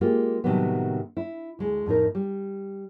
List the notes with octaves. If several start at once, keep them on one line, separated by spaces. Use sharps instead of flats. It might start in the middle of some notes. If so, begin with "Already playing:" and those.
G#3 A#3 F4 G4
A2 C3 D#3 F#3 G3 B3
E4
D2 G#3
F2 A2 D#4 A#4
G3